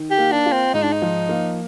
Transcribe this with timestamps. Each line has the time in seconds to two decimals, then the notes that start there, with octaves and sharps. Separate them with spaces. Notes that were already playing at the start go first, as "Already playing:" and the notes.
Already playing: D#3
0.11 G4
0.18 A#3
0.32 D4
0.46 F4
0.52 C4
0.74 G#2 D#4
0.83 D4
0.92 D#4
1.02 F3
1.29 A#3